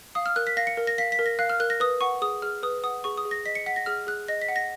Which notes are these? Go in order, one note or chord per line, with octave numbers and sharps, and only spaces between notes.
F5 D#6
F6
A#4 F#6
B6
F5 A#6
C#7
A#4
A#6
F5 B6
B6
A#4
A#6
F5 F#6
F6
A#4 F#6
A#6
B4 D#6
F#5 C#6
G#4 D#6
G#4 F6
B4 D#6
F#5 D#6
G#4 C#6
D#6
G#4
A#6
D#5 B6
C#7
F#5 B6
A#6
G#4 F6
G#4 F#6
D#5 A#6
B6
F#5
A#6